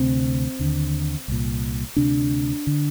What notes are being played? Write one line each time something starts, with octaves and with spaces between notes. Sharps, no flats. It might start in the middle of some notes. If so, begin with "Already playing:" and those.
Already playing: D2 C3 C4
D#2 D3
C2 A#2
D2 C3 D4
D3